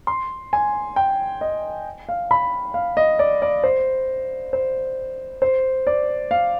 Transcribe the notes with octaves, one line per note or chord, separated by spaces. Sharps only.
C6
G#5
G5
D#5
F5
B5
F5
D#5
D5
D5
C5
C5
C5
D5
F5